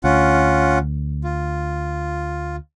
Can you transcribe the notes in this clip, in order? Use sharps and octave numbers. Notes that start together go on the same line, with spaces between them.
D2 C#4 F4 F#5
F4